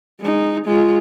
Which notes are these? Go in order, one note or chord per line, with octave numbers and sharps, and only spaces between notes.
G#3 D#4
G#3 F4